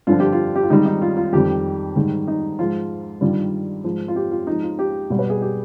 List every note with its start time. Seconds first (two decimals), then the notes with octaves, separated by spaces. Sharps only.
0.07 G2 D3 F3 F4
0.20 G4
0.32 F4
0.55 G4
0.63 F4
0.70 G#2 D#3 G3 D#4
0.86 D#4
1.02 F4
1.17 F4
1.33 F2 D#3 G3 G4
1.96 G#2 D#3 G3
2.28 D#4
2.59 G#2 F3 F4
3.21 G2 D#3 G3 F4
3.84 G#2 F3
4.08 F4
4.16 G4
4.31 F4
4.47 G#2 F3 D#4
4.63 F4
4.79 G4
5.10 B2 G3
5.19 B4
5.30 G#4
5.42 G4